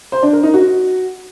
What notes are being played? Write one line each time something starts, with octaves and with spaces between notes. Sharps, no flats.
C5
D4
A#4
D#4
F#4